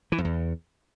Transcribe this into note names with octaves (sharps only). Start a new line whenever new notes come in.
E3
F2
E2